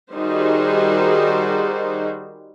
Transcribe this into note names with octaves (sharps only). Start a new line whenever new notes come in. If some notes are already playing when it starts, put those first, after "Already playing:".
D#3 G3 D#4 F#4 G#4 C5